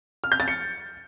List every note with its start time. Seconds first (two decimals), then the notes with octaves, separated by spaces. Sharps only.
0.24 F6
0.32 G6
0.40 A6
0.48 C#7